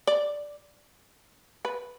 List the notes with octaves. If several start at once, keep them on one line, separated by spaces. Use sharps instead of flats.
D5
B4